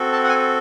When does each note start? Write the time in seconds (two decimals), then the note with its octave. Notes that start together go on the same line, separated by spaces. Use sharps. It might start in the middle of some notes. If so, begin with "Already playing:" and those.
Already playing: C4 F#4 A4
0.13 A5
0.24 F#5
0.29 G#5